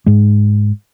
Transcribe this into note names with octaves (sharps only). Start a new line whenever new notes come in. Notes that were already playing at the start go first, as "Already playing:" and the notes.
G#2 G#3